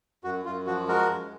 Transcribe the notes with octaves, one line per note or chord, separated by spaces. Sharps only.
F#2 F#4
F#2 F4
F3 F#4
G#3 F#4 A#4
F#2